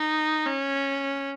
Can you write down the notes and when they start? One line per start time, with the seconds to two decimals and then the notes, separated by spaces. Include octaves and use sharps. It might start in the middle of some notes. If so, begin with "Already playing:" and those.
Already playing: D#4
0.45 C#4